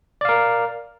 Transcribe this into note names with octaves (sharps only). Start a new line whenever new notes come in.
A#4 D5 F5